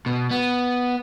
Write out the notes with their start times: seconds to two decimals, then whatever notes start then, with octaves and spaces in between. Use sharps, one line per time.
0.06 B2
0.31 B3